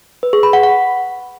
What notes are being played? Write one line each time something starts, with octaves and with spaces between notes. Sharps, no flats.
B4
G#4
B5
F#5
F#5